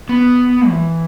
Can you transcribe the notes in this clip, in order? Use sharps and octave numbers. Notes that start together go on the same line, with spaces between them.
B3
E3